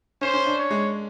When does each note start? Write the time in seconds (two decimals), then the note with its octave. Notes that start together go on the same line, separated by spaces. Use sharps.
0.21 C#4 C5
0.34 C#4
0.46 D4
0.58 C#5
0.71 G#3